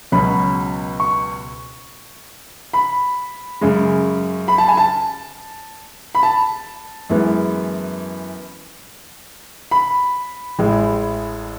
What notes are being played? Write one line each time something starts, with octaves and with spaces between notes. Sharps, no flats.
C#2 B2 F#3 C#4 B5
C#6
B5
F#2 C#3 G#3
B5
A5
G#5
A5
B5
A5
F#2 E3 G#3 B3
B5
A1 A2 G#3